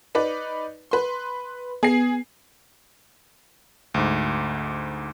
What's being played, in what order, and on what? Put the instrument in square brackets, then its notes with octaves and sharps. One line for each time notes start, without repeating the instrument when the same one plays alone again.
[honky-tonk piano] D#4 B4 D5
B4 C6
[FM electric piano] B3 [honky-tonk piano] G#4 C7
[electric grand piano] D2 G#2